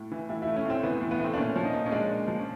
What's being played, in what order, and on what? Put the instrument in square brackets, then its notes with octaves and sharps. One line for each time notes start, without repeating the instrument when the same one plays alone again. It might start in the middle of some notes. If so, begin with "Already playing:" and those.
Already playing: [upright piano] A2
E3
A2 E4
E4
A3
C#4
A2 C4
E3 B3
A2
B3
A3 C4
D4
A#2 C#4
F3
D#4
A#2
C#4
G#3 D4
A#2
F3
C#4